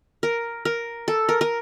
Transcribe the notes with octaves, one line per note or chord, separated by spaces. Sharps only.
A#4
A#4
A4
A#4
A#4